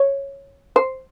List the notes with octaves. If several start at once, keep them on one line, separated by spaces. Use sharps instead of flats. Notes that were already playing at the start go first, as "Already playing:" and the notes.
Already playing: C#5
C5